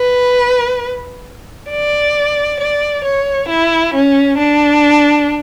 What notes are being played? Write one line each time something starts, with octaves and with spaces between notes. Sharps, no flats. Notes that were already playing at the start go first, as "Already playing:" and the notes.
Already playing: B4
D5
D5
C#5
E4
C#4
D4